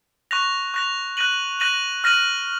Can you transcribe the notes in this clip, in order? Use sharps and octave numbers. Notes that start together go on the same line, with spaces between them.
C#6 F#6 A#6 F7
C#6 F#6 A#6 F7
F#6 A#6 D#7 F#7
F#6 A#6 D#7 F#7
F6 A#6 D#7 F#7